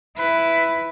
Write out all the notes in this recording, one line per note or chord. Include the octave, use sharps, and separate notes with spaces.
E4 B4